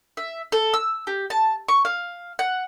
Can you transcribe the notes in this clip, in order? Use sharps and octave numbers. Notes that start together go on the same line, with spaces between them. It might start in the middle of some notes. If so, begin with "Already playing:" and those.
E5
A4
E6
G4
A5
C#6
F5
F#5